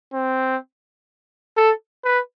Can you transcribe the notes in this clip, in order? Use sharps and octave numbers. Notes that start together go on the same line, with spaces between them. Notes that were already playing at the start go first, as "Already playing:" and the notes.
C4
A4
B4